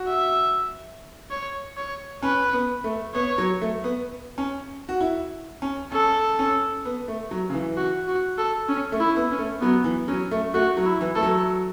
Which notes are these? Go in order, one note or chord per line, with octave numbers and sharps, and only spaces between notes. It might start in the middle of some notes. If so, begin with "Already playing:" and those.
Already playing: F#4
E5
C#5
C#5
C#4 B4
B3
A3
B3 C#5
F#3
A3
B3
C#4
F#4
E4
C#4
C#4 A4
C#4
B3
A3
F#3
C#3
E3
F#4
F#4
A4
C#4
A3
E4
B3
C#4
A3
F#3 B3
E3
F#3 C#4
A3
A3 F#4
F#3
E4
E3
A3 A4
F#3